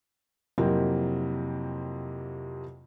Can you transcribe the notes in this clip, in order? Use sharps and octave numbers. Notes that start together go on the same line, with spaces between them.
F2 C3 F#3 A#3 C4 E4